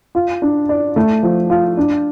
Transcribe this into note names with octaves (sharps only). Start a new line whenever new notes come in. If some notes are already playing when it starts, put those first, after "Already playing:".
F4
D4
D5
A3
F3
F4
D4